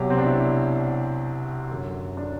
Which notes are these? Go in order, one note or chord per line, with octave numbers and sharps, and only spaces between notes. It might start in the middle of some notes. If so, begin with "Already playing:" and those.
Already playing: C2 B2 F#3 G4
C4
D4
E4
F#2 D3 F#3
D4